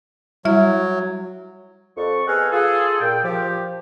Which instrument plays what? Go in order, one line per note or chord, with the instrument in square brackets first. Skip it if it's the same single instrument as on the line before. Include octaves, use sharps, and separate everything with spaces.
[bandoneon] F#3 [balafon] G3 E4 E5
[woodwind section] F2 D5 C#6
B3 G#4 A4 D#5 F5 F#5
F4 G#4 A4
A#2 G5
F3 G4